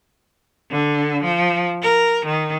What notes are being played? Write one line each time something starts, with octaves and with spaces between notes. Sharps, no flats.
D3
F3
A#4
D#3